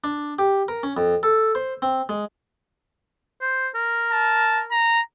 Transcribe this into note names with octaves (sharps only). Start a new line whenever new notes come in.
D4
G4
A#4
C#4
F2
A4
C5
C4
G#3
C5
A#4
A5
A#5